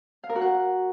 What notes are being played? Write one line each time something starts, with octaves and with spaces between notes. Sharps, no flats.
F5
A#4
F#4
F#5